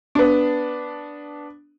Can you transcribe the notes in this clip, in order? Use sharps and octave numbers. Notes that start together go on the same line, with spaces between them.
B3 D4